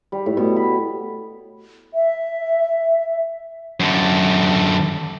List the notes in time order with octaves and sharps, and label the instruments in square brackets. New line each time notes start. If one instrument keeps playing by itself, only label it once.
[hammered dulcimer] G3
A2
B2
B5
[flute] E5
[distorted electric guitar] F#2 D3